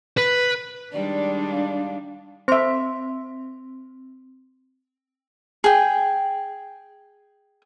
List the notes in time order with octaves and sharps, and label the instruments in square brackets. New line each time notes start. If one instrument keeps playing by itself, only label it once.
[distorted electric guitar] B4
[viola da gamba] D#3 G3 G#3 [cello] D4 [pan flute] D5
[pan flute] F5
[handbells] C4 C6 [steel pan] C5 E5
[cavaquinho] G#4 G5